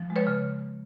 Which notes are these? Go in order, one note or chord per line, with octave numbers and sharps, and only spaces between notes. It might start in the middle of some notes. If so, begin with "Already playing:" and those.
Already playing: F3
G#3
B4 C#5
C#3